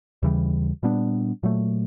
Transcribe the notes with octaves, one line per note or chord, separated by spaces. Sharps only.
D#2 C#3 E3 G3
A#2 G3 B3 D4
A#2 F#3 A3